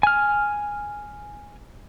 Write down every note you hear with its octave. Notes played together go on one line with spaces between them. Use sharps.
G#5 F6